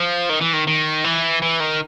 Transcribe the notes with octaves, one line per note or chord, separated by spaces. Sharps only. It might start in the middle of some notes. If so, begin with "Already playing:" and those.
Already playing: F3
D#3
E3
D#3
D#3
E3
E3
D#3